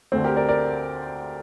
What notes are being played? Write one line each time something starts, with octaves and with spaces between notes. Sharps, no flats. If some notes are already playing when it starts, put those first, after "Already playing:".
D2 D3 A3 C4
G4 A#4
A#4 D5
A#4 D5